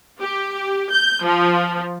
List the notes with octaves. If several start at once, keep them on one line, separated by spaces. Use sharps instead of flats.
G4
G6
F3